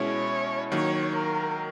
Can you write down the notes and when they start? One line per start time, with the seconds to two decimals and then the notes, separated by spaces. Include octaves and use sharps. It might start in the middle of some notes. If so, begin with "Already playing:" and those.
Already playing: B2 G#3 C#4 E4 C#5
0.71 D#3 F#3 A#3 C#5
1.16 A#4